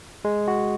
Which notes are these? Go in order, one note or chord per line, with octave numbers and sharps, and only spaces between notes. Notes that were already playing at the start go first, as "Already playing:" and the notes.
G#3
F#4